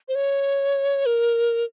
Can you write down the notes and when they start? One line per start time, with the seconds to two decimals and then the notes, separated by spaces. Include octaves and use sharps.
0.08 C5
0.15 C#5
1.06 A#4